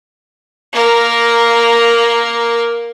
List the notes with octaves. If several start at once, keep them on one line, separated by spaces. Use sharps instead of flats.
A#3 A#4